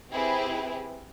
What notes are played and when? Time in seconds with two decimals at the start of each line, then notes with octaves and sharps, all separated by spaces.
0.12 C4 E4 G4 G#4 B4